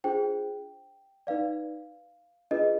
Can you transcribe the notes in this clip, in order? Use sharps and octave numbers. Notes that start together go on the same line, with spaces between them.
D4 F4 G#4 C5 G5
D#4 B4 D5 F5
D4 F4 G#4 B4 D#5